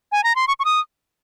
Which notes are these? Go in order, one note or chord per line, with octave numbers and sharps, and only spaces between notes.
G#5
A#5
C6
C#6
C#6
D#6